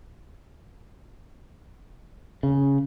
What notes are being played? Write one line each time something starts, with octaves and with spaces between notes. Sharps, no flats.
C#3